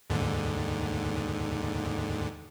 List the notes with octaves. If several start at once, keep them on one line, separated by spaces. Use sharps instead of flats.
D#2 G#2 D3